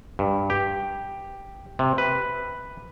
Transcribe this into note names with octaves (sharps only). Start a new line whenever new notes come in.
G2
G4
C3
B4